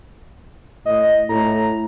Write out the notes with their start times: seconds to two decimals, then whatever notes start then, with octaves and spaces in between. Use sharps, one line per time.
0.86 A2 D#5
1.29 A2 A#5